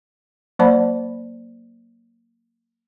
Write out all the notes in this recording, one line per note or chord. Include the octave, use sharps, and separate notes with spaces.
F#3 A#3 C5 D5 A5 B5